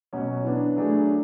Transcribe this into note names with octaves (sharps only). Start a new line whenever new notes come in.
B2 F#3 C#4
E3 B3 D4
F#3 A3 D4 G#4